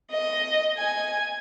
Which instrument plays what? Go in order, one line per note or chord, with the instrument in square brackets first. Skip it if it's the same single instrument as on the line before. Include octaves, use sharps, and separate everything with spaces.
[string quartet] D#5
G#5